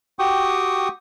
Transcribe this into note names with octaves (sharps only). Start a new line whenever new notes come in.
F#4 G4 G5 C#6 D#6